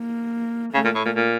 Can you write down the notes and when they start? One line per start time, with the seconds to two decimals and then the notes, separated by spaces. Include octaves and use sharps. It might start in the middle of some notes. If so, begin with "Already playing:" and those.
Already playing: A#3
0.74 C#3 A3
0.85 A#2
0.95 A2
1.06 A#2
1.16 A#2